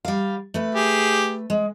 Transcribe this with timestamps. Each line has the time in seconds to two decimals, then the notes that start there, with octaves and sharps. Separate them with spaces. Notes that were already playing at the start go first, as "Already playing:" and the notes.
0.05 G3 F5
0.54 A3 B4
0.75 G4 G#4
1.50 G#3